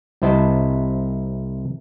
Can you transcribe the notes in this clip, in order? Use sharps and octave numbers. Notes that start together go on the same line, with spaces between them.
C2 C3 E4 C5 D#5 A5